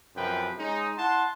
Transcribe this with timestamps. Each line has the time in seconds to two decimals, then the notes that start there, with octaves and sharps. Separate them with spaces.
0.16 F#2 C3 F3 B4 G5
0.59 G#3 C#4 D#4
0.98 E4 F#5 A5 C6